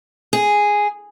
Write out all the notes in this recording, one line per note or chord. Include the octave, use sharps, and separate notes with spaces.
G#4